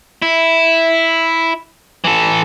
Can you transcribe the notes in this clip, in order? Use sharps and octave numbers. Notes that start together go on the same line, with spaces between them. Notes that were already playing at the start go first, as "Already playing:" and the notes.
E4
E3 A4